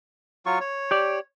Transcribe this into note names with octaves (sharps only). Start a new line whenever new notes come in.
F#3 F4 C#6
C#5
G4 D5